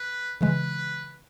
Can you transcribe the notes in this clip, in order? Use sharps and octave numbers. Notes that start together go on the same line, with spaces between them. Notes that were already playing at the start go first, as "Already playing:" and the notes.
Already playing: B4
C#3 E3 G#3 B4